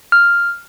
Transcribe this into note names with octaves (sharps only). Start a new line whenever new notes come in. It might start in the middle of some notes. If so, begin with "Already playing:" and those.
F6